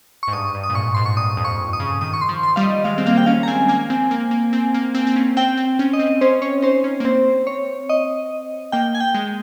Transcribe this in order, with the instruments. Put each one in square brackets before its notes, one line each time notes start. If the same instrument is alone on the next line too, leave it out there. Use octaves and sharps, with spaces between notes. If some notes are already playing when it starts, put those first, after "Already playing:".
[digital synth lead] C#6
[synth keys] G#2
[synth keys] G2 [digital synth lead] D#6
[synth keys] G2
[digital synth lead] D#6
[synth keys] A#2
[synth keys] G#2 [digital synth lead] C#6
[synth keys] G#2 [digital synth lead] C6
[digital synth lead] C#6
[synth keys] G2 [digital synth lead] D#6
[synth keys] F2
[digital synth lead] C#6
D#6
[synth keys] C#3
[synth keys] D#3 [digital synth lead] D#6
[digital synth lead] C#6
C6
[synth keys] F3
[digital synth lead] C6
[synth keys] G3 [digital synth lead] F5
[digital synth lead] D#5
[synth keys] G#3 [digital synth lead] F5
[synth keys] C4
[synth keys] A#3 [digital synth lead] F5
[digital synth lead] G5
[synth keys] C#4 [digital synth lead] F5
[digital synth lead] A#5
[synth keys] C4 [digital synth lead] G#5
[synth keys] A#3 [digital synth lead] G#5
[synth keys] C4
A#3
A#3
C4
A#3
C4
C4
C#4
[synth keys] C4 [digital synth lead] G5
[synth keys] C4
C#4
[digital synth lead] D#5
[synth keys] C4
[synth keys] C#4 [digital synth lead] C5
[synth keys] C#4 [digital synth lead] C#5
[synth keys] D#4 [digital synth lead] C5
[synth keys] C#4
A#3
[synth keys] C4 [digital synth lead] C5
[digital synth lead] C#5
D#5
[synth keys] A#3 [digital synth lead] G5
[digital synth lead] G#5
G5
[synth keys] G#3